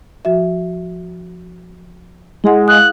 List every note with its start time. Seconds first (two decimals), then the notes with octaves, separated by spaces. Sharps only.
0.25 F3 F#4 E5
2.44 G#3 E4 G#4 F#5
2.68 F5 D#6 F#6